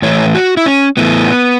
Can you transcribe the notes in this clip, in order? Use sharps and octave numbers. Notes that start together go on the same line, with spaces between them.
A2 E3 A3 C#5
F#4
E4
C#4
A2 E3 A3 B3